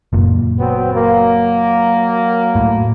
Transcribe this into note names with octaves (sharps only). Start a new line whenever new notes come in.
F#1 A#2
F#3 B3 C4
F#3 A#3
A2